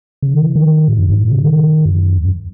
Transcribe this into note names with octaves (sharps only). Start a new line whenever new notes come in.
C#3
D#3
E3
D#3
A2
F#2
G#2
A2
C#3
D#3
F#2
E2
F#2